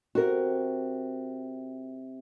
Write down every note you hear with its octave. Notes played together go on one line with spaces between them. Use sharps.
C3 F#4 A#4